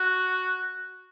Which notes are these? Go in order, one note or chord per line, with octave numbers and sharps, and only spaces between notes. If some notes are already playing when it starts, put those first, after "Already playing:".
Already playing: F#4